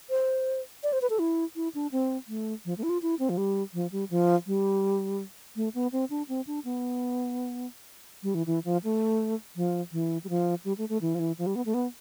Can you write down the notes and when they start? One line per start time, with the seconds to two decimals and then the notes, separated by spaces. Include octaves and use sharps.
0.10 C5
0.83 D5
0.93 C5
1.02 B4
1.10 A4
1.19 E4
1.56 E4
1.75 D4
1.92 C4
2.28 A3
2.65 F3
2.78 A3
2.83 E4
2.90 F4
3.02 E4
3.19 C4
3.29 F3
3.38 G3
3.74 F3
3.92 G3
4.10 F3
4.46 G3
5.56 A3
5.75 B3
5.92 C4
6.10 D4
6.29 C4
6.47 D4
6.65 B3
8.23 G3
8.35 E3
8.47 E3
8.65 F3
8.84 A3
9.56 F3
9.92 E3
10.24 G3
10.29 F3
10.65 G3
10.78 A3
10.89 A3
11.01 E3
11.15 F3
11.19 E3
11.38 F3
11.47 G3
11.56 B3
11.66 A3
11.74 B3